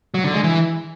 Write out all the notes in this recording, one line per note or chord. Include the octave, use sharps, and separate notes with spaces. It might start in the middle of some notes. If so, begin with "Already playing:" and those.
F#3
D3
G#3
E3